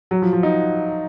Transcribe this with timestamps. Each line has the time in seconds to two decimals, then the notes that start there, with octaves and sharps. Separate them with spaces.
0.11 F#3
0.22 F3
0.33 F3
0.43 D#4